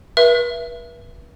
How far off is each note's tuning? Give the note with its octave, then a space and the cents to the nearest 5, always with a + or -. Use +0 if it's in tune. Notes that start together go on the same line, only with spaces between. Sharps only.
B4 -40 E5 +20